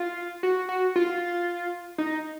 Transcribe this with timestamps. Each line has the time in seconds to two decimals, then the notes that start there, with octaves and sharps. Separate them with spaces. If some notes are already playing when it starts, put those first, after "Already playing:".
Already playing: F4
0.43 F#4
0.69 F#4
0.96 F4
1.98 D#4